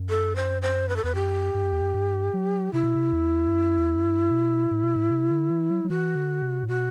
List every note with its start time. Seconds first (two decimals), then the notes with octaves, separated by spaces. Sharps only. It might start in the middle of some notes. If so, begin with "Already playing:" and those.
Already playing: F#2
0.09 A4
0.36 C5
0.62 C5
0.89 B4
0.96 A4
1.04 E2 B4
1.15 F#2 G4
1.54 G2
1.63 F#2
1.73 E2
1.81 F#2
1.94 G2
2.33 F#3
2.73 C3 E4
2.83 B2
2.95 C3
3.13 E2
3.48 G2
3.52 F#2
3.78 E2
3.96 F#2
4.05 G2
4.31 B2
4.71 A2
4.84 B2
4.96 A2
5.11 C3
5.31 D3
5.50 E3
5.70 F#3
5.84 F#3
5.89 E3 F#4
6.15 D3
6.42 C3
6.63 A2
6.68 B2 F#4